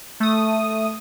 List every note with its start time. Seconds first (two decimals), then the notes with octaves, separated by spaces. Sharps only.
0.20 A3 D#6